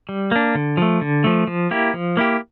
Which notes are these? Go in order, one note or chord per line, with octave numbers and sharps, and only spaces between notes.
G3
A#3 D4
D3
F3 A3
D3
F3 A3
F3
A#3 E4 G4
F3
A#3 E4 G4